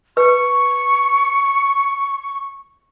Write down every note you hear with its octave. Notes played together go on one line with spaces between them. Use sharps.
B4 C#6